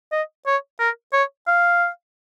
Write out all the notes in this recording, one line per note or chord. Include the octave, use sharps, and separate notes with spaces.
D#5
C#5
A#4
C#5
F5